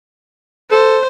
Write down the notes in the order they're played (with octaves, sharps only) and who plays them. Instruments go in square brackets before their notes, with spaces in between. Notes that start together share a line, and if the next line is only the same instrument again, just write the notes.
[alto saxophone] A4 [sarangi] C5